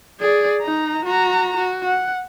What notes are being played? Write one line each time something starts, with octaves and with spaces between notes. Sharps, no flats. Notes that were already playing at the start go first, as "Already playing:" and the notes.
G#4 D5
D#4 A#5
F#4 A#5
F#4
F#5